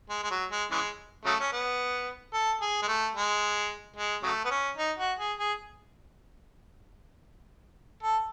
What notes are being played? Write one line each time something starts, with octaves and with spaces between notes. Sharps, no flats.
G#3
G#3
F#3
G#3
C#3 E3 G#3
C#3 F#3 A3
C#4
B3
A4
G#4
G#3
A3
G#3
G#3
C#3 F#3 A3
B3
C#4
D#4
F#4
G#4
G#4
A4